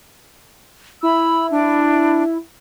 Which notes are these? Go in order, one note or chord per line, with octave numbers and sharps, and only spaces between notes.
E4 B5 E6
D4